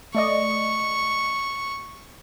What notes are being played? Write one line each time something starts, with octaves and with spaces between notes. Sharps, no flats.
A3 D5 D#5 C#6